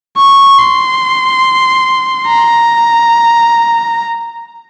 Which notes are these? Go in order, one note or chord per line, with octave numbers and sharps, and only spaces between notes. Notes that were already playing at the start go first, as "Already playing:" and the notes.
C#6
C6
A#5